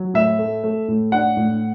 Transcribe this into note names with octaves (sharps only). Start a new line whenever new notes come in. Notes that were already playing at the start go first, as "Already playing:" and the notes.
Already playing: F#3
A2 E5
A3
A3
A2
D4 F#5
A2